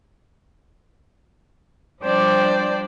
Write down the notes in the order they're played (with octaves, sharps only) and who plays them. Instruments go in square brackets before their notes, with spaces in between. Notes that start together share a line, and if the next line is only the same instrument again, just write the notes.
[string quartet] F3 G3 D4 C5 D5 G5